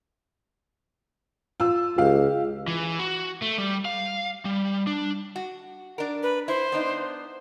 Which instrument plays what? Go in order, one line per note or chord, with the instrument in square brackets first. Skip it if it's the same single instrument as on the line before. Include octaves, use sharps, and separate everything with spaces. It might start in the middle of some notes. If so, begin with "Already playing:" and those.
[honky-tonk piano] F4 E6
[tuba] C#2 [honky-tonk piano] G4 F5
[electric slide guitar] E3
F#4
A3
G3
F5
G3
D4
[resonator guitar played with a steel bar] F#4
D4 A#4
[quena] B4
[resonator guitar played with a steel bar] E4 [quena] C5
[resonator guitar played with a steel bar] B3 D4 D#4